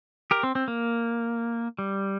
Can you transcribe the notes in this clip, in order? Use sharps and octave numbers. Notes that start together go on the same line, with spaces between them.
G4 A#4
C4
C4
A#3
G3